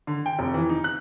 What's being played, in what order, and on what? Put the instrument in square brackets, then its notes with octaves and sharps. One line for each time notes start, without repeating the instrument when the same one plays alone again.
[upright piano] D3
G5
F1
E3
D#4
F#6